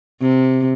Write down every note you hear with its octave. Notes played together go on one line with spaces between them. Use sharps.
C3